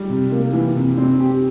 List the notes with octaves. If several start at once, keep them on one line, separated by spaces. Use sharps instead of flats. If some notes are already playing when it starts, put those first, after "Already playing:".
Already playing: G3
C3
A#3
E3
C3
C4
G4